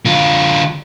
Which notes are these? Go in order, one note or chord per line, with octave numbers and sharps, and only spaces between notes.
D3 F4